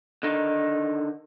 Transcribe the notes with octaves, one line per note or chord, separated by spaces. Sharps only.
D3 D#3 D#4